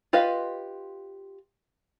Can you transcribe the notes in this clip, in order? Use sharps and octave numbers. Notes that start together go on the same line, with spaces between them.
F4 G4 B4 D#5 F5